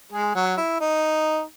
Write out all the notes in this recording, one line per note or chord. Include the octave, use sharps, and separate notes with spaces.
G#3 G#4
F#3 F#4
E4
D#4